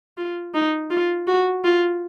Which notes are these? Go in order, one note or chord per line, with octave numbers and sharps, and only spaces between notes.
F4
D#4
F4
F#4
F4